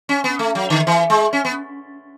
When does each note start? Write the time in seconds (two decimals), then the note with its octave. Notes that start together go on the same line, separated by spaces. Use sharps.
0.09 C#4
0.24 B3
0.39 A3
0.55 F#3
0.70 D3
0.87 E3
1.10 G#3
1.33 C#4
1.45 B3